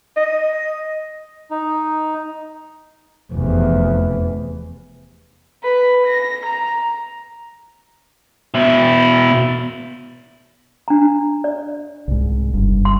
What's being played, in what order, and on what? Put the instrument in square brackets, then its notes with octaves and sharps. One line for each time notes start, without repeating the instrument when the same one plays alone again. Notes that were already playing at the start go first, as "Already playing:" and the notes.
[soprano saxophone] D#5
[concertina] D#4
[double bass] F1 E2
[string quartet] B4
A#6
A#5
[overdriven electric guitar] B2 E4
[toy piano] D4 A#5
D5
[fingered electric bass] C2 G#2
F#1 G2
[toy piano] C6